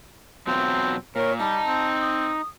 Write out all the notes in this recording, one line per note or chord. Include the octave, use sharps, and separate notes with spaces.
B2 F#3 C4 F4
A#2 A#4 C#5
G3 D#4 A5
C4
D#6